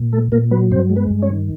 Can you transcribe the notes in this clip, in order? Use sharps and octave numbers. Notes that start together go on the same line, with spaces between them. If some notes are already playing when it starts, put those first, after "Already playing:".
Already playing: A#2
A3 A4
A#2 A#3 A#4
F#3 B3 B4
G2 C4 C5
G#3
B3 B4
G2
C#4 C#5
D#3